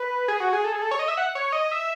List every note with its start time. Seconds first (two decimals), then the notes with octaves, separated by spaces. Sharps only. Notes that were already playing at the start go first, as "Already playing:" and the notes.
Already playing: B4
0.28 G#4
0.40 F#4
0.53 G#4
0.64 A4
0.73 G#4
0.82 A4
0.91 C#5
0.99 D#5
1.08 E5
1.17 F#5
1.35 C#5
1.52 D#5
1.71 E5